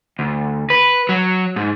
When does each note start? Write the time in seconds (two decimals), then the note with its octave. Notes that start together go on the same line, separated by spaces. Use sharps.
0.19 D2
0.70 B4
1.09 F#3
1.56 G#2